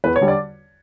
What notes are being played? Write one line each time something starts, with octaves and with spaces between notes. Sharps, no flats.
E2 B4
C#5
D3 G3
D5